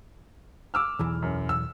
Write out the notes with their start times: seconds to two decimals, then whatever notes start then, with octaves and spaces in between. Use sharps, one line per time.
0.74 D6 E6 F6
0.99 B1 E2 E3
1.22 F#2
1.49 E6